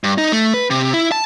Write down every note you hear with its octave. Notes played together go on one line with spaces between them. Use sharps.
G2
D#4
A3
B4
C3
E4
A5